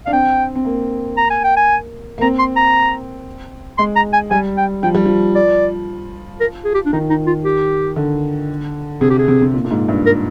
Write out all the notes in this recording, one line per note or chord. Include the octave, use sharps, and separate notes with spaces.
D4 F5
C4 G5
C4
A#3
A#5
G#5
G5
G#5
A#3
C4 A#5
C6
A#5
G#3 C6
A#5
G#5
G3 G#5
G5
F3 G5
G3
F3
D5
A#4
G#4
G4
D4
D#3 D#4
D#4
F4
G4
D3
C3 G#4
G4
G#4
C3
C3
A#2
A#2
G#2
G2
A#4